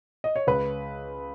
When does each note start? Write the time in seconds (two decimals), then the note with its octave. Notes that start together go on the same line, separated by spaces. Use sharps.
0.24 D#5
0.36 C#5
0.47 C#2 B4